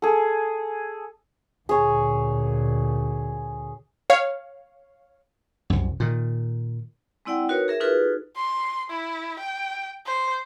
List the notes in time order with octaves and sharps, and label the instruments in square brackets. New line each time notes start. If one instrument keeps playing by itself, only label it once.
[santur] G#4 A4
[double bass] D2 A#2 [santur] G#4 C#5
[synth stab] C#5 F5
[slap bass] C2 F#2
A#2 D#3
[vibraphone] G#3 C4 E4 D5 F#5 G5
D#4 F#4 A#4 B4 C#5
G#4 A#4 E5
D#4 F4 F#4 G#4 A4 B4
[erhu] C6
E4
G5
C5